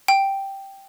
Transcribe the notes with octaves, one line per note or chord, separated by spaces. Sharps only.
G5